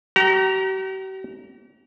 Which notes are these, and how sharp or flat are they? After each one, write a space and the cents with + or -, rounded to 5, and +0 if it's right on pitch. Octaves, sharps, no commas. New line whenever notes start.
G4 -45 A#5 +0